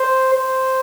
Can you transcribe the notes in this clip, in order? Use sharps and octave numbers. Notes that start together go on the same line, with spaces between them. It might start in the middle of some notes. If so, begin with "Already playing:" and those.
Already playing: C5
C5